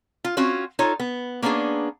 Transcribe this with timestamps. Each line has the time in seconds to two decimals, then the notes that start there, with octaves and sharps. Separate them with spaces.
0.25 F4
0.37 C4 C#4 F4 F#4
0.79 D#4 F4 A4 C#5
1.00 B3
1.42 A#3 B3 C#4 D4 G#4